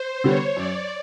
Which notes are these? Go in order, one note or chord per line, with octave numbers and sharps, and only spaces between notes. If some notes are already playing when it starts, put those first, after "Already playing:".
Already playing: C5
D3 G3 B3 C#5
F#2 D5